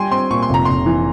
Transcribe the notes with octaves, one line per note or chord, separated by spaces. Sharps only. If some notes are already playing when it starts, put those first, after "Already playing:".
Already playing: G3 G5 G#5 C6
C4 C6
A#2 C#6
C6
F1 A#5
F1 C6
E3